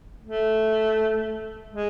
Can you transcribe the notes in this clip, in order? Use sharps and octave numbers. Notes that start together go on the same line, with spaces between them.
A3
G#3